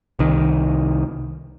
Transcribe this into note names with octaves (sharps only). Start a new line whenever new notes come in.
C2 D#3